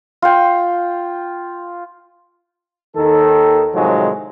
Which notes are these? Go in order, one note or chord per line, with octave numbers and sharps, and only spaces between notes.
F4 G5
D#2 D#3 A4
A2 C3 D#3 F3 F#3 G#3